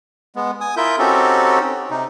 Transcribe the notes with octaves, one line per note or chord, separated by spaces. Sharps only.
G#3 B3
G#5 D#6
E4 F4 A#4 E5 G6
C4 C#4 D#4 F#4 G4 A4
C3 D#4